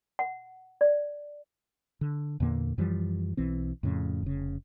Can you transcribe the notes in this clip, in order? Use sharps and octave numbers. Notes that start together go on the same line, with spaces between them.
F#5
D5
D3
E2 A#2 D3 A#3
F#2 E3 F3 G3
B1 E3 C4
F2 A2 C#3
F1 C#3